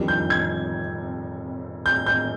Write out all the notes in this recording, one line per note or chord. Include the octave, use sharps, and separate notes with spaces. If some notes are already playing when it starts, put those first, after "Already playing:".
Already playing: F2 D#3 G3 D4
G6
G#6
G6
G6